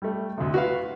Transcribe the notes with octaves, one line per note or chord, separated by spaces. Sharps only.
G3 A3
D2 C3
F#4 B4 F5